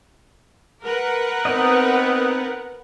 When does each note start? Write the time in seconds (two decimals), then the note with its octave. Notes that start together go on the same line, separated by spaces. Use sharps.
0.84 A#4 B4 F#5
1.45 B3 C4 D#4 D#5